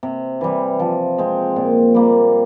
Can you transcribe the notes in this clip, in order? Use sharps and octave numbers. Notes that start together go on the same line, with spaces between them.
C3
E3 G3
F3
G#3 C4
A#2
G3 A#3